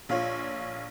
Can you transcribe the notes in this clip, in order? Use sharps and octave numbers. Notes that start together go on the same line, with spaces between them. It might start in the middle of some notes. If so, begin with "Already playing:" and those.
A#1 F4 C#5